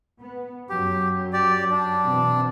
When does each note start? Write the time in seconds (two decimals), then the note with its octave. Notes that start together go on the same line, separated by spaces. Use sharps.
0.20 B3
0.70 F#2 F#3 G4
1.33 G4 D5
1.71 D4
2.04 B2 E3 C4